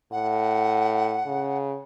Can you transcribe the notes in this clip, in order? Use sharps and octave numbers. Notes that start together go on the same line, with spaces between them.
A2 F#5
C#3